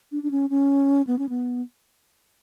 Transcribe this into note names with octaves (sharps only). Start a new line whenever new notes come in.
D4
D4
C#4
C#4
B3
C#4
B3